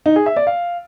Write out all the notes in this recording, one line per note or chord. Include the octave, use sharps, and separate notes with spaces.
D#4
G#4
E5
D5
F5